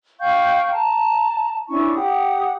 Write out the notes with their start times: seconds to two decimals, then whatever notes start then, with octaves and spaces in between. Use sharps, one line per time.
0.20 F5 G5 C#6 G6
0.71 A5 A#5
1.68 C#4 D4 E4 C#6
1.93 G4 F#5 D#6